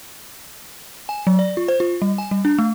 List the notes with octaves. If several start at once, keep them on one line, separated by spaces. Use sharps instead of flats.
G#5
F#3
D5
F4
C5
F4
G3
G#5
G3
D4
A3